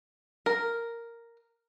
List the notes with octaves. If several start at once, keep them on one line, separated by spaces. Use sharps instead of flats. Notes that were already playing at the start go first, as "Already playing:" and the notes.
A#4